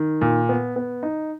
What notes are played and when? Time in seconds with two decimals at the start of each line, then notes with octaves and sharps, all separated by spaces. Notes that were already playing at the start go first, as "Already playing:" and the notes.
Already playing: D#3
0.21 A#2
0.49 B3
0.76 B3
1.03 D#4